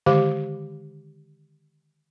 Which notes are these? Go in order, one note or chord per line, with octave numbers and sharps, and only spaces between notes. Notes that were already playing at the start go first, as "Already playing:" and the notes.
D3 D#3 G#3 G4 F5 D6